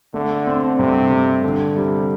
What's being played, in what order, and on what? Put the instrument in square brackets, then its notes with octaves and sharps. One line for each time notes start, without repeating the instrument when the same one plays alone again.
[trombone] D3 [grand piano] A3
[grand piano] C4
[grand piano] G2 [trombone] C3
[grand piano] G2
D3
[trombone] C3 [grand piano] G3